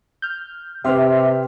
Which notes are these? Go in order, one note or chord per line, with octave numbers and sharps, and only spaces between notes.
F6 G6
C3 C4 G4 B4 E5 C6 F6